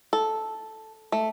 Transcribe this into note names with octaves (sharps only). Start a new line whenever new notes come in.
A4
A3